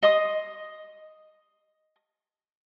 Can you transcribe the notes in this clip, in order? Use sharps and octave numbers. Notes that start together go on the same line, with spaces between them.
D#5 C6 D#6